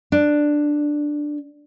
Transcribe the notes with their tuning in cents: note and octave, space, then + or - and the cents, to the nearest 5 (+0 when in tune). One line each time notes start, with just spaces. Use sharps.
D4 +5